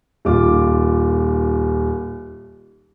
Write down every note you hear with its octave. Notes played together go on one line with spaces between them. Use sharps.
D#1 D#3 F4 D6